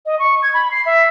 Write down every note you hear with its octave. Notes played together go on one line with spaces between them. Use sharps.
D#5
C#6
G#6
B5
C7
E5